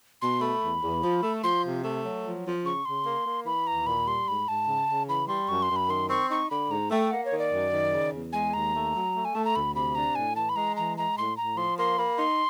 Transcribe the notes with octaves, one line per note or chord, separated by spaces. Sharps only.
B2 C6
A3 B5
E2
E2
F3
A3
F3 C6
C3
A3
F#3
F3
F3
C#3 C#6
C#3 C6
A#3
A#3
E3 B5
D#2 A#5
A#2 B5
G3 C6
G#2 B5
G#2 A5
C#3
C#3
E3 B5
G3 C6
F#2 C#6
C6
F#2
B5
D#3 C6
C4 C#6
D#4 C#6
D3 B5
G#2 A#5
A3 G5
A#3 F#5
C#5
D#3
D5
F#2
D#3
C#3
E2
G#3 G#5
D#2 A#5
A3
F#3
A3
G#5
A3 A5
A#5
D2 B5
C3 B5
D4 A#5
A2 G#5
E3 A5
B5
G#3 A#5
E3 A#5
G#3 A#5
A2 C6
A2 A#5
F3 C6
A#3 C6
A#3 B5
D#4 C6